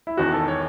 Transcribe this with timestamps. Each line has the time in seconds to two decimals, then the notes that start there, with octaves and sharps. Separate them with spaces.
0.07 E4
0.17 E1 E2 D#3 F#4
0.33 A4
0.48 C#5